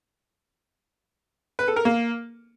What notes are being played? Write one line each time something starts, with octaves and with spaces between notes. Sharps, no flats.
B4
A4
A#4
A#3